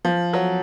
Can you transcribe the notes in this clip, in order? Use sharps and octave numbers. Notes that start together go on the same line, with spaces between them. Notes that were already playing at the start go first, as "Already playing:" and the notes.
F3
F#3